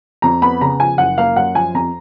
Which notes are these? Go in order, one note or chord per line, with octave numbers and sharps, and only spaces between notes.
F2 A#5
B3 B5
C#3 A#5
F3 G#5
F#1 F#5
A#3 F5
F#2 F#5
F3 G#5
F2 A#5